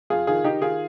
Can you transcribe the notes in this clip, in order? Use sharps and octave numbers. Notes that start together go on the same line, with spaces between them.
F2 F4 G#4
D#3 F4 G#4
D#3 D#4 G4
D#3 F4 G#4